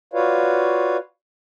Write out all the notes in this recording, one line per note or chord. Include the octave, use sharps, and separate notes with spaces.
F4 F#4 B4 C#5 D5 F5